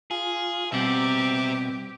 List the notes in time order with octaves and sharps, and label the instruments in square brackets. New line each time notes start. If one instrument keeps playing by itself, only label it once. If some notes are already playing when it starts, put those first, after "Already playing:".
[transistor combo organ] F4 [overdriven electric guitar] G#4
[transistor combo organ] B2 [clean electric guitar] G3 C4 F#5 [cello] G4 [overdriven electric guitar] C5 E5